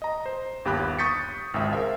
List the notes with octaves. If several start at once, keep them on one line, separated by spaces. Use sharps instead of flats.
D#5 A#5
C5
G1 D#2 G4 B5 F#6
C#6 D#6 G6 A6 B6 C#7
G#1 C#2 E5
G#4 A#4 C5 E5 F5